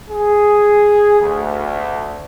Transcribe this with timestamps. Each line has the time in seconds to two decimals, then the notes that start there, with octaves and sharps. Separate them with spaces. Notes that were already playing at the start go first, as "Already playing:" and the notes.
0.10 G#4
1.20 D2